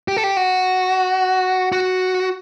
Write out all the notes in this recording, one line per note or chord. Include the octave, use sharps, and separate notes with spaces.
G4
A4
G4
F#4
F#4